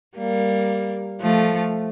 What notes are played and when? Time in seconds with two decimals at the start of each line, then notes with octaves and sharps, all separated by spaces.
0.17 G3 A#3
1.21 F3 A3